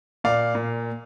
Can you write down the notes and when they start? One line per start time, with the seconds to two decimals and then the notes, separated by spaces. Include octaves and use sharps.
0.24 A#2 D5 F5
0.55 A#2